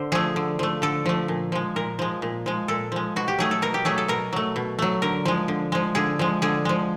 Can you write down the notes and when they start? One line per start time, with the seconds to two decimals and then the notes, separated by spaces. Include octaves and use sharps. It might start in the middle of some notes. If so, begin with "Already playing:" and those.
Already playing: D3 C5
0.12 F3 A3 G#4
0.36 D3
0.59 F3 A3
0.82 D3 A4
1.06 F3 A3
1.28 A#2
1.52 F3 G#3
1.76 A#2 A#4
1.99 F3 G#3
2.22 A#2
2.46 F3 G#3
2.68 A#2 A4
2.92 F3 G#3
3.16 B2 F#4
3.28 G4
3.38 F#3 A3 G#4
3.51 A4
3.62 B2 A#4
3.74 G4
3.85 F#3 A3 G#4
3.98 A4
4.08 B2 A#4
4.33 F#3 A3
4.56 B2
4.79 F#3 A3
5.02 D3 A#4
5.25 F3 G#3
5.48 D3
5.72 F3 G#3
5.95 D3 G#4
6.19 F3 G#3
6.42 D3 G#4
6.65 F3 G#3